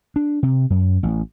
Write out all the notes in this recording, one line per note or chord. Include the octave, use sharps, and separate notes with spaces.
D4
C3
F#2
A1